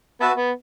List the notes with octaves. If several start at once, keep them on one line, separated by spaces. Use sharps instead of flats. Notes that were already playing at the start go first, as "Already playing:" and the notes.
B3 F#4 B4 E5 A5
B3